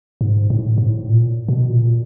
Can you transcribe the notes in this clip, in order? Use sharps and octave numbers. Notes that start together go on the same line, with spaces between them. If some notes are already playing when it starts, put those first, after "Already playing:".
G#2
A2
G#2
A2
A#2
B2
A#2